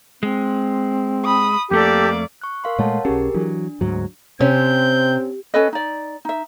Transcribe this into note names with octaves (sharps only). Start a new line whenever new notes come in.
G#3 C4
B5 D#6
F2 A3 A#3 G4 A4 D5
C#6 F#6
A#4 F5 C6
A#2 G#3 A3 C#5 F#5 A5
B1 C#4 G4 G#4 A#4
E3 F#3 D4
D2 G#2 F#3
C3 C4 C#4 G6
C#4 A4 B4 D#5
D#4 D5
D#4 E5